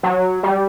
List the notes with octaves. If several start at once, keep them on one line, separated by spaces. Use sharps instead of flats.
F#3
G3